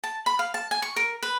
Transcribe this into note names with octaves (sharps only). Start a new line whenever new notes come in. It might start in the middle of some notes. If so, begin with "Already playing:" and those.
A5
B5
F5
A5
G#5
C#6
A#4
B4